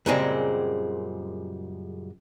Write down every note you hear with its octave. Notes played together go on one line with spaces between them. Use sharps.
F#2 A#2 C#3 G3 G#3 C4